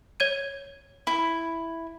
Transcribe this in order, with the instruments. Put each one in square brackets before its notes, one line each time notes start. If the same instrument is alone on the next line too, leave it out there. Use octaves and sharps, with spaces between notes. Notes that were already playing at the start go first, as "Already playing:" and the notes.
[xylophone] C#5 G#6 D#7
[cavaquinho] E4